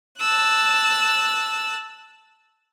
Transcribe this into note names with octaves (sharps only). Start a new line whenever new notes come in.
A5 E6 F#6